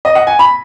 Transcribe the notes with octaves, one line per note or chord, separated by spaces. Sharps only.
D#5
F#5
G#5
B5